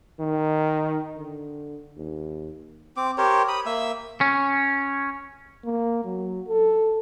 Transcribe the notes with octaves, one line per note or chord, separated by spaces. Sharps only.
D#3
D3
D#2
C4 D6
G4 A#4 C5 C#5
B5 D#6
A#3 E5 E6
C#4
A#3
F#3
A4